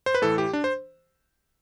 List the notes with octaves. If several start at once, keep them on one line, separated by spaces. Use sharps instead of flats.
C5
B4
A2 E3 A4
G4
D4
C5